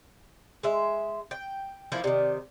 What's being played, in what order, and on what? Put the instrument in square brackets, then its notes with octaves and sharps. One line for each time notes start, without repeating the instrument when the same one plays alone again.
[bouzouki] G#3 E5
G5
F3 A#3 E4
[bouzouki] C3 D#3 [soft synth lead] D5